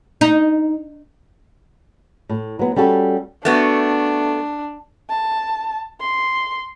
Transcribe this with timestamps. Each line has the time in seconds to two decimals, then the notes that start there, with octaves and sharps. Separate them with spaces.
0.21 D#4
2.29 A2
2.59 F#3 B3
2.76 G3 C#4 F#4 A4
3.45 A3 B3 D4 F#4
5.10 A5
6.01 C6